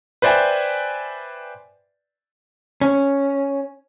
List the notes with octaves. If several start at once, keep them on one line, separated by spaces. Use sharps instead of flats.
B4 C5 D5 E5 G5 G#5
C#4